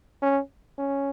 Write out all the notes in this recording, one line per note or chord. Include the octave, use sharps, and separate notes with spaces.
C#4
C#4